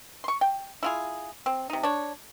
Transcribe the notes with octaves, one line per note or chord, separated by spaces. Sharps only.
C6 C#6
G5
E4 F4 G#4
C4
C3 D#4
D4 C#5